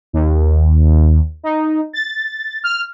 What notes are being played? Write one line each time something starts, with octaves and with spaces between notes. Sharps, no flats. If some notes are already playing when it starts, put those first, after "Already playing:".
D#2
D#4
A6
F6